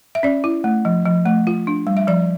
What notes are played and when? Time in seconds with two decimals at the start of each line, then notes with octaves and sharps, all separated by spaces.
0.15 E5
0.23 C#4 D5
0.44 E4
0.64 A3
0.85 F3
1.05 F3
1.26 A3
1.47 F4
1.67 D4
1.87 G3
1.97 E5
2.07 F3 D5